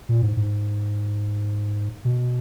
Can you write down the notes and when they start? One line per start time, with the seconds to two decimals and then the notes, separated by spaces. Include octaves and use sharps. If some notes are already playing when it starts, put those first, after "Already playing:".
0.09 A#2
0.22 G#2
0.37 G#2
2.05 B2